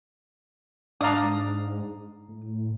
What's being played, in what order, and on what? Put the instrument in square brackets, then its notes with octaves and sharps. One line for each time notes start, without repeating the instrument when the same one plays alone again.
[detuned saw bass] G#2 [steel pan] D4 D5 F5 [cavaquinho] A#5 D#6
[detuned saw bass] A2